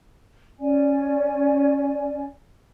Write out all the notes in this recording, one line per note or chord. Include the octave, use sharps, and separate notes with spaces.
C#4 D5 G#5